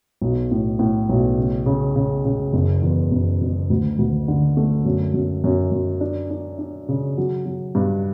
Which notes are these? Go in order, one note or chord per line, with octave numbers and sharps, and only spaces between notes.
B1
A2
A2
B1
C#3
C#3
C#3
C#3
F#1
E2
F#1
F#1
D2
D2
D3
A3
F#2
F#2
F#2
F#2
D4
D4
D4
C#3
F#3
F#3
G2